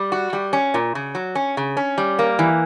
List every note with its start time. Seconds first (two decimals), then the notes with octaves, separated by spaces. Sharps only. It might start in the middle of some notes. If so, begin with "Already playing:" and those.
Already playing: G3
0.12 F#4
0.33 G3
0.53 C#4
0.74 A#2
0.95 C#3
1.15 F#3
1.35 C#4
1.57 C#3
1.77 C#4
1.98 G3
2.19 A#3
2.39 E3